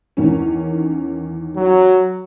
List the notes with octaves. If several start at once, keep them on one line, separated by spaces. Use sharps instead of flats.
E2 D#3 C#4
F#3